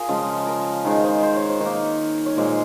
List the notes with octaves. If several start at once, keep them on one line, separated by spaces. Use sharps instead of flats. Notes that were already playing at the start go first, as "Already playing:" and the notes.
Already playing: F4 G#4 A#4
C#3 F3 G#3
A#4
D#3 G#3 C5
C5
C5
C#5
C5
D#3 A#3 C#5
C#5
A#2 G#3 C5